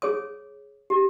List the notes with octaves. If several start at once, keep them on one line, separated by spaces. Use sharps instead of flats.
G#4 C#5 D#6
G4